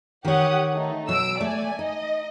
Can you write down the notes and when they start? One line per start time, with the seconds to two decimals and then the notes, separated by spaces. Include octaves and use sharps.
0.25 D#3 G4 C#5 F#5 D#6
0.73 A3 D#4
1.09 B2 F#3 E6 D7
1.41 A3 D5 G#5
1.79 D#4 D#5